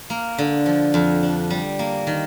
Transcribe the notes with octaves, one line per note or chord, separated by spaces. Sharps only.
A#3
D3
F3
F2
D4
G3
A#3
D#3